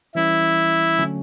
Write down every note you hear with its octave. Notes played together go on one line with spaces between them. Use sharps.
E3 G3 C#4 E4
D3 F#3 A3 C#4